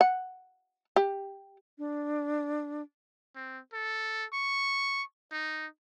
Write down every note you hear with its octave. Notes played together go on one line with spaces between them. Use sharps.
F#5
G4
D4
C4
A4
C#6
D#4